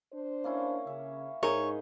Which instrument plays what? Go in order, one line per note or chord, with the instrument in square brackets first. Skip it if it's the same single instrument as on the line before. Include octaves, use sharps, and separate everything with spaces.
[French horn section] D4 C5
[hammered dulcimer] A#3 C#4 E4
[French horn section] C#3 [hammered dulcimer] E5
[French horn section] G#2 [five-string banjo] D#4 G#4 A#4 [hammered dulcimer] C5 E5 [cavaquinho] C#5